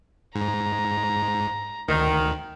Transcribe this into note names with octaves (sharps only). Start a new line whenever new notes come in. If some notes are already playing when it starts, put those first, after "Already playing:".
G#2 A#5
D2 D#3